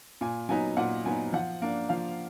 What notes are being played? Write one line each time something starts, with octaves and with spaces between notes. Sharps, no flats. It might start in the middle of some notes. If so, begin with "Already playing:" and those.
A#2 G#5
F#3 B3 D#4 G#5
A#2 F#5
F#3 B3 D#4 G#5
F3 F#5
A#3 D4
F3 F5